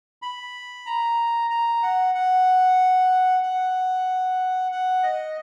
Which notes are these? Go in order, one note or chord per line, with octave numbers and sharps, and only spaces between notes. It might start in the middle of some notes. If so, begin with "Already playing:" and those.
B5
A#5
A#5
F#5
F#5
F#5
F#5
D#5